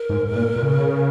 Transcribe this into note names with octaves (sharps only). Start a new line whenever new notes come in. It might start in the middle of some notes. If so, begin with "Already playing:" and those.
Already playing: A#4
G#2
G#2
A#2
A#2
C#3